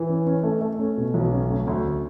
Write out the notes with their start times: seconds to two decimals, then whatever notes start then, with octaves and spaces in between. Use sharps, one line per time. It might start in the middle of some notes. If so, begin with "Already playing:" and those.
Already playing: E3
0.09 C#4
0.26 C#4
0.43 A3
0.61 A3
0.79 C#4
0.97 B2
1.14 B1
1.32 C#4
1.50 D2
1.67 D2